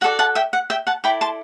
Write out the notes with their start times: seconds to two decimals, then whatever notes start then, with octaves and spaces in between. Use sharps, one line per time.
0.01 F#4 A4 D5 F#5
0.19 F#5 A5
0.35 E5 G5
0.53 F#5
0.70 E5 G5
0.87 F#5 A5
1.04 E4 A4 D5 G5 B5
1.21 A5 C6